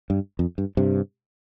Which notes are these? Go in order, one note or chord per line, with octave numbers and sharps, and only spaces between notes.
G2
F2
G2
G2 C3